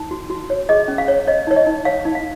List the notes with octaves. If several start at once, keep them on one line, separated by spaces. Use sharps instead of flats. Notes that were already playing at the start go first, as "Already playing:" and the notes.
Already playing: D#4
F#4
F#4
C#5
G#4 D#5
C#4
F5
C#5
C#5 D#5
D#4 C#5
D#5
D#4
C#5 F5
D#4
F5